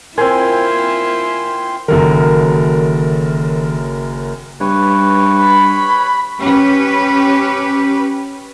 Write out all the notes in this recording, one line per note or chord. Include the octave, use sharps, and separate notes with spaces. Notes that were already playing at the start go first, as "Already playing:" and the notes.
C4 E4 F4 A#4 G#5 C6
F#1 F#2 D#3 A4 A#4
G2 B4 C#5
B5
C#4 G4 B4